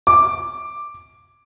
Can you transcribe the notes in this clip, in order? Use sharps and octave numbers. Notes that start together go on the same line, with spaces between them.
D6